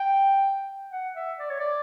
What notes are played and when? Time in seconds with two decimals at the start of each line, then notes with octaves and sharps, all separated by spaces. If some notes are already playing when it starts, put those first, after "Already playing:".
Already playing: G5
0.92 F#5
1.16 E5
1.39 D5
1.49 C#5
1.59 D5